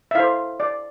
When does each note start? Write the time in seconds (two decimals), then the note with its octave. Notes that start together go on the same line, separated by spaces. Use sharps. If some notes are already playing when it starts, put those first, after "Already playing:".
0.11 E5
0.15 E4 A4 C5 F5
0.60 D5